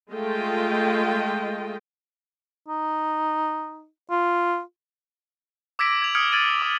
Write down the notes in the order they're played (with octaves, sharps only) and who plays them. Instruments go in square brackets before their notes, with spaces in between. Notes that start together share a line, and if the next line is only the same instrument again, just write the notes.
[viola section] G#3 A3 F4 D#5 G5
[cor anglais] D#4
F4
[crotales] D6 E6 G#6 A#6 B6 D7
G#6 F7
D#6 F6 G#6 C#7 D7
F6 G#6 A6 D7 D#7 F#7
C#7
D6